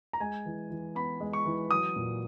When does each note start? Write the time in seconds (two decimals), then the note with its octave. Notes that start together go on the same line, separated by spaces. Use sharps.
0.13 A#5
0.20 G#3 G#5
0.46 E3
0.70 E3
0.95 B3 B5
1.20 G#3
1.33 C#6
1.46 E3
1.70 F#3 D#6
1.96 A#2